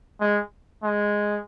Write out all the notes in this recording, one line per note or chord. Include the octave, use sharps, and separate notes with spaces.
G#3
G#3